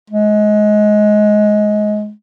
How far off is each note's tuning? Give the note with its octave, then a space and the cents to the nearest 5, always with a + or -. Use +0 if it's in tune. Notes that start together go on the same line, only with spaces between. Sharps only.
G#3 +20